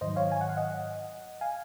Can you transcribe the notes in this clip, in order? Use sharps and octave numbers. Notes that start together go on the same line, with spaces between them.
G#2 D#3 F#3 C5 D#5
C#5 F5
G#5
F#5
F5
D#5 F#5
F5 G#5